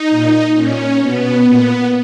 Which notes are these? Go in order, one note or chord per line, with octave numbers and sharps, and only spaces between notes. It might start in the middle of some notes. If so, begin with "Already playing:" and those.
Already playing: D#4
A#2
A#2 C#4
B2 B3
A#2